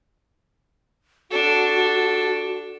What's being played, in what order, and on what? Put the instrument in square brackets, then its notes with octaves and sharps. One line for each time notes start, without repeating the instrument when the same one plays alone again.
[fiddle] D4 A4 [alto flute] F#4